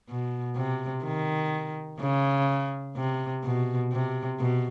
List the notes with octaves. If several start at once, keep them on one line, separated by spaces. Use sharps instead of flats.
B2
C3
D#3
C#3
C3
B2
C3
B2